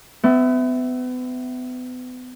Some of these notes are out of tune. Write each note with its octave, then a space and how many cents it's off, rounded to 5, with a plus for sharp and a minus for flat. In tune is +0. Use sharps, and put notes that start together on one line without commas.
B3 +35 E5 +0